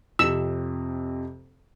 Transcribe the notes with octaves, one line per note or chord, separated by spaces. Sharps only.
F2 C3 E6